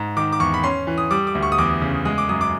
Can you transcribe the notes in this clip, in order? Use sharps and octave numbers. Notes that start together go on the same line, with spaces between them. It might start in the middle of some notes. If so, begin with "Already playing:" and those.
Already playing: G#2
D#3 D6
D6
E2 C#6
B5
C#4 C6
E3
D#6
G3 D6
D6
D2
C#6
D#6
E2 D6
C#3
G#3 D#6
D6
F#2 D#6
D6